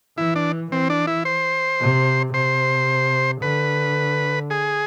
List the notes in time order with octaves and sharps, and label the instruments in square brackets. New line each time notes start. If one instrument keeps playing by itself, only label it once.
[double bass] E3 [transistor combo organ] E4
[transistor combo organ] D4
[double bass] E3 [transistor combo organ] C4
[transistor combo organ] D4
E4
C5
[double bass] C3
[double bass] C3 [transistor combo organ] C5
[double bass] D3 [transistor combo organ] B4
[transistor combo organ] G#4